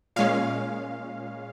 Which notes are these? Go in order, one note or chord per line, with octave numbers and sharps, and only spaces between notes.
A#2 G#3 C#4 F5